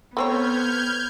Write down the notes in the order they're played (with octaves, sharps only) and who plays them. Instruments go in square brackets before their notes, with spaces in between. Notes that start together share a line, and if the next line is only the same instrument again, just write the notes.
[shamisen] A3 C4 C#5 [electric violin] B3 [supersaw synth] F6 G6 G#6